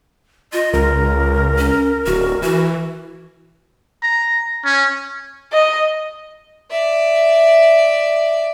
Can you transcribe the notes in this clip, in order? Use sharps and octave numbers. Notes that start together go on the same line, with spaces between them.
F4 D#5
C#2 A#4
C#4
D1 F#4
E3 F#4
A#5
C#4
D#5
D5 E5